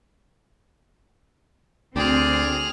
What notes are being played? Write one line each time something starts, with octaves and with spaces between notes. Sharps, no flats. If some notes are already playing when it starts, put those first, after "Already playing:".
D2 C4 G#4 D5 G5 F6